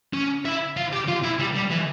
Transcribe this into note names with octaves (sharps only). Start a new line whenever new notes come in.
C#4
E4
F4
G4
F4
E4
G3
G3
E3